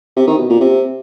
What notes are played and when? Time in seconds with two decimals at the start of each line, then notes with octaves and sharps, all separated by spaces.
0.16 C3
0.27 D#3
0.38 B2
0.49 A#2
0.60 C3